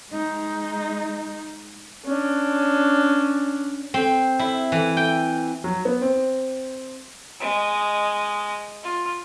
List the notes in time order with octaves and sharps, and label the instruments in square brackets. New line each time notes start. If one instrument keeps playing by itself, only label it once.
[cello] G#3 D#4
[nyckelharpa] C#4 D4
[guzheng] C4
E4
E3
G5
[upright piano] F#3
B3
C4
[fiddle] G#3 D#5
F4